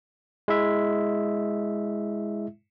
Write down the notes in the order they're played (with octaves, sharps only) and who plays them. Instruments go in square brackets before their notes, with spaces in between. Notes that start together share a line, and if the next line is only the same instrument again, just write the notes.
[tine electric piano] G#3 E4 E5